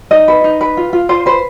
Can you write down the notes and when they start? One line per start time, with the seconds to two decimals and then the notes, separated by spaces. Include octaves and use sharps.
0.11 D#4 D#5
0.28 B4
0.44 D#4
0.61 B4
0.77 F4
0.93 F4
1.09 F4 C5
1.26 B4 C5